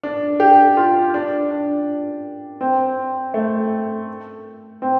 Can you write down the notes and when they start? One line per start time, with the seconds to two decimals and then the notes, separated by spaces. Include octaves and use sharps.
0.03 D4
0.40 G4
0.77 F4
1.14 D4
1.51 D4
2.61 C4
3.34 A3
4.82 C4